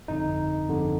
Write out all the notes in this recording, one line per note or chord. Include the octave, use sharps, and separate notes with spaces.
G1 F2 D3 D#4
G1 F2 D3